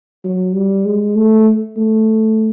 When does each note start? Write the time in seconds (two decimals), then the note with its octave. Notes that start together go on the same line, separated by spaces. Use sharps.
0.25 F#3
0.55 G3
0.85 G#3
1.16 A3
1.77 A3